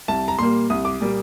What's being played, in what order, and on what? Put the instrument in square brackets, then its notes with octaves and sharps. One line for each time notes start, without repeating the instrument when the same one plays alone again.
[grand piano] C2 A5
A#5
A#2 G3 A#3 C6
C2 D#6
D6
A#2 G3 A#3